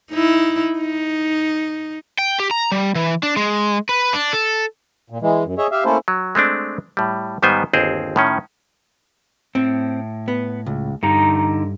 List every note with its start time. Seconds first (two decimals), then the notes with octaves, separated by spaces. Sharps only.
0.11 D#4 E4
0.80 D#4
2.18 G5
2.40 G4
2.51 A#5
2.72 G3
2.95 E3
3.23 D4
3.37 G#3
3.89 B4
4.13 D4
4.33 A4
5.10 A#2
5.22 E3 G#3
5.44 F#2
5.58 G#4 C#5 D#5 E5
5.72 G4 E5 F5
5.85 A3 A#3 C#4 E4 A4 C5
6.08 F#3
6.35 G#3 A3 C4 D4
6.97 A2 G3
7.42 G#2 D#3 G3 B3 C5 G#5
7.73 G1 D#2 C4 G#4 A#4 C5
8.16 A2 D#3 C#4
9.55 A2 C4
10.28 B3
10.66 C#2
11.03 G2 D3 D#4 A#5